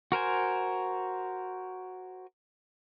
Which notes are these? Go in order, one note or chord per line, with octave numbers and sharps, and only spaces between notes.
F#4 A#4 C5 G#5